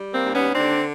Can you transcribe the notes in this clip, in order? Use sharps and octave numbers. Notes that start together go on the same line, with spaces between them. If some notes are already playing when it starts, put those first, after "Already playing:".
Already playing: G3
A#3 C4
D#2
B3 C#4
D3 C4 D4